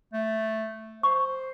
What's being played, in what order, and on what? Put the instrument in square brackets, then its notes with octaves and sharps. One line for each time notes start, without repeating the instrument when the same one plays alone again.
[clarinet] A3
[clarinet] C5 [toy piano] C#6